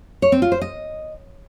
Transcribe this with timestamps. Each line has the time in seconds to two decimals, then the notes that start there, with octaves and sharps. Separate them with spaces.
0.22 C#5
0.32 C4
0.42 F4
0.52 C5
0.61 D#5